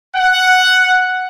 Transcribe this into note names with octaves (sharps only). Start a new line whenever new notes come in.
F#5